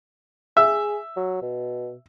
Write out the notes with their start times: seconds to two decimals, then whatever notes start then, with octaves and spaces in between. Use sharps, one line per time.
0.57 G#4 E5
1.17 F#3
1.42 B2